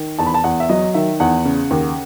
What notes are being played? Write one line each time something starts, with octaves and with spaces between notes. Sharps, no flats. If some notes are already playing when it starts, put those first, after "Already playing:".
Already playing: D#3
E2 A5
B5
A5
E2 F#5
E5
F#3 D#5
D#3 E5
E2 F#5
C#3
D#2